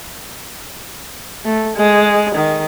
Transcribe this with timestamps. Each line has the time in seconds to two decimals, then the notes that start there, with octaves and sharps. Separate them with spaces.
1.45 A3
1.76 G#3
2.35 D#3